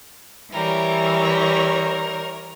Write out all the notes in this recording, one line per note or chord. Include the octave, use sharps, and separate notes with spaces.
E3 G3 A#4 C#5